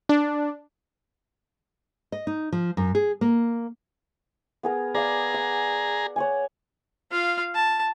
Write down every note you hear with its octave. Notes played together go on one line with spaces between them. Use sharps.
D4
D#5
D#4
F3
F#2
G#4
A#3
B3 G#4 A#4
G#4 D5 F5 A#5
F#5
C#5 F#5 G#5
F4 F5
A5